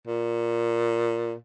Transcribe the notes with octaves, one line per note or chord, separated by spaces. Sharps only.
A#2